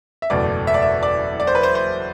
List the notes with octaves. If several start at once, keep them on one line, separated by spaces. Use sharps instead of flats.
E5
F#1 E2 B2 A3 D5
E5
D5
E5
D5
D5
C5
B4
C5
C5